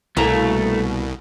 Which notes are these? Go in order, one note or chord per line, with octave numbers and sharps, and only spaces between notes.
C2 B2 A3 A#3 E4 A#5